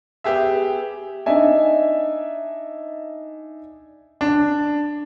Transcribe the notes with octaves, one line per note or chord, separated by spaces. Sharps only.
B3 G4 G#4 E5
D4 D#4 D5 E5 G#5
D4